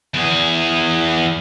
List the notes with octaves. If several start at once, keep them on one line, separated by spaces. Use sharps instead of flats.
E2 G#4